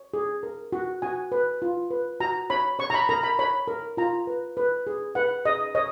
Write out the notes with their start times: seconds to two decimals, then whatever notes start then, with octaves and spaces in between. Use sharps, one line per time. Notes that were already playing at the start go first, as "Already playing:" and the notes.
Already playing: C#5
0.14 G#4
0.43 A#4
0.72 F#4
1.02 F#4 G#5
1.32 B4
1.62 F4
1.91 B4
2.20 F#4 A#5
2.50 C#5 B5
2.79 C#5 C#6
2.90 A#5
2.94 B5
3.09 A#4 A#5
3.23 B5
3.39 C#5 B5
3.68 A#4
3.97 F4 A#5
4.27 B4
4.57 B4
4.87 G#4
5.15 B4 F#5
5.45 G#4 D#5
5.75 C#5 D#5